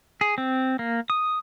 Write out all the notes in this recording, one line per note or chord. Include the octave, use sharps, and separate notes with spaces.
G#4
C4
A#3
D#6